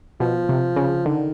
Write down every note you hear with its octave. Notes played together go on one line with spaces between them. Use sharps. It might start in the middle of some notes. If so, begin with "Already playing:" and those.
B2 F3
C3
C#3
D3 D#3